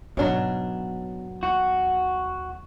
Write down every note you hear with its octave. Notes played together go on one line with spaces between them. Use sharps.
G#2 B2 F#3 B3 C#4 D4
D#2 F#4